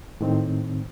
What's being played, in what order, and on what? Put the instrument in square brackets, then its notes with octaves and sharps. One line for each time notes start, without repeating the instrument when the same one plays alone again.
[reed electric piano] A2 D#3 C4